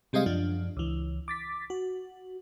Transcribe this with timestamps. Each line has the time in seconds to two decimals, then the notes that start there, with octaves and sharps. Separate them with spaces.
0.13 C3 G3 G#3 C4 D#5 F5
0.26 F#2 F3 D4
0.77 C#2 E3
1.28 D6 A6 B6
1.70 F#4